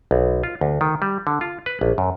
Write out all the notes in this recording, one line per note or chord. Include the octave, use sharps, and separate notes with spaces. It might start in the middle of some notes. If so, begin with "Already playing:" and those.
B1
F4
D2
D#3
G3
D3
F4
B4
A#1
F#2